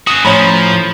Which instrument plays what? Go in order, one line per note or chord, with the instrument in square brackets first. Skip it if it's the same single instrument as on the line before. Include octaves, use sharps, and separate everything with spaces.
[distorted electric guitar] C#3 F#4 [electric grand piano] D#6
[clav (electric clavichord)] A2 C#4 C5 [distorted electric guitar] F3 [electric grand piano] C#5 A#5 B5